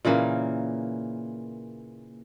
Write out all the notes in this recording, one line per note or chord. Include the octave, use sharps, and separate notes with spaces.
A#2 C#3 E3 A#3